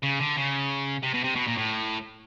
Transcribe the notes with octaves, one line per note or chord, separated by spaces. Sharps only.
C#3
D3
C#3
C3
B2
C3
B2
A#2
A2